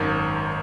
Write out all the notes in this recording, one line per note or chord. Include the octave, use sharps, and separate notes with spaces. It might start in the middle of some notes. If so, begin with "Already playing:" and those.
Already playing: G#1 F#2 D#3